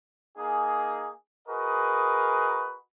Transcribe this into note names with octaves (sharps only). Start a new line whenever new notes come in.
A#3 D#4 G#4
F#4 G#4 A#4 B4 D#5